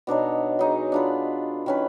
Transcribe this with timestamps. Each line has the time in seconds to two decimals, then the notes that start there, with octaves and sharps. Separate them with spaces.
0.07 B2 D4 D#4 C#5
0.59 F#3 D#4 G#4
0.92 D4 F4 B4
1.66 D#3 C#4 B4